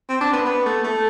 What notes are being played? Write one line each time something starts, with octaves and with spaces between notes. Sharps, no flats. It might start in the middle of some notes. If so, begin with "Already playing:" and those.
C4
D4
B3
B3
A3
A3